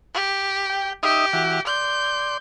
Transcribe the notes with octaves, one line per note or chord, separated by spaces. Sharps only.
G4
G5
D#4 G4 E5 D#6
E3 F#4
D5 C6 G6